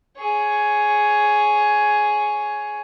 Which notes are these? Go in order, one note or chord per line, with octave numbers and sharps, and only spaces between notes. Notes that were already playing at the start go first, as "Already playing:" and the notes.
G#4 C#5